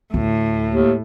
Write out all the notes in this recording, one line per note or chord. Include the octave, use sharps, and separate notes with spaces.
D2 A2
D#2